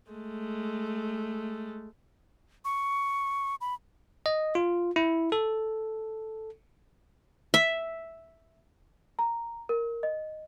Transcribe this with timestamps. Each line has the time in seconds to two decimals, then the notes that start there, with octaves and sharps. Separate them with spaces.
0.11 G#3 A3
2.65 C#6
3.61 B5
4.26 D#5
4.55 F4
4.96 E4
5.32 A4
7.54 E5
9.19 A#5
9.69 A#4
10.03 D#5